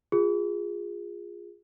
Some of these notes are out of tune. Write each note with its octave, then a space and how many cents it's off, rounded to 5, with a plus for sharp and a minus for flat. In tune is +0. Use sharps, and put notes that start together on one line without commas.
F4 +5 G#4 -20